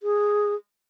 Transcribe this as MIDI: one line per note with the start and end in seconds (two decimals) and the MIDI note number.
0.03 0.55 68